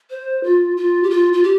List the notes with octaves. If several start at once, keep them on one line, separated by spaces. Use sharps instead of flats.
C5
F4
F4
G4
F4
F4
G4